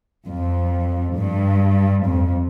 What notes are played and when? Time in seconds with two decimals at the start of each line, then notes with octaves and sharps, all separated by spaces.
0.26 F2
1.16 G2
2.05 F2